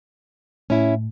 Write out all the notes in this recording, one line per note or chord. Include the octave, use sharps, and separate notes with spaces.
A2 C#4 E4